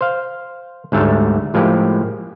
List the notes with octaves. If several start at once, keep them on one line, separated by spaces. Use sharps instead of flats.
C5 F5
D2 G#2 G3 A3 C#5 A5
A2 F3 G#3 A#3 G4